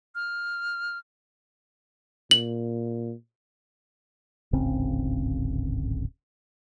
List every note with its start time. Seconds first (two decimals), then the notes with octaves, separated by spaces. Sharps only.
0.15 F6
2.31 A#2 F#7
4.53 D1 G#1 C#3 C4